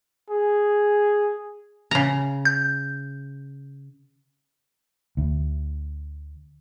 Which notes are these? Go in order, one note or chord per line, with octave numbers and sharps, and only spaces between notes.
G#4
C#3 A#5
G6
D2